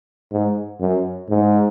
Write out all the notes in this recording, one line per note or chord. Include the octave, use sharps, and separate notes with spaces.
G#2
F#2
G#2